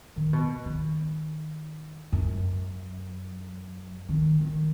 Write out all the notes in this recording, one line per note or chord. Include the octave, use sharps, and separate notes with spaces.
D#3
B2
D#3
F#2
D#3
D#3